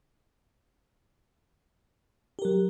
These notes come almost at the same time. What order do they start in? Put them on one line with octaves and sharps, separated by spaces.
G4 A#4 F#3